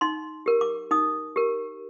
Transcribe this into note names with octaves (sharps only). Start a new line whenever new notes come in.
D#4 C6
G4 A#4
D6
D#4 D#6
G4 A#4